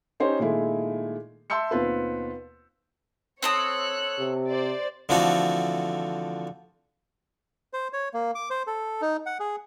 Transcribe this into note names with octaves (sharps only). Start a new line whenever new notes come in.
C#4 D#4 G4 C5 C#5
A#2 D#3 G#3 A3 E4
E5 A5 C6 E6 G6 C#7
D#2 B2 C4 F4 B4
C4 A4 C#5 D#6 F#6
C3
C5 D5
D3 E3 F3 A3 C4 F#4
C5
C#5
A#3
D6
C5
A4
D#4
F#5
G#4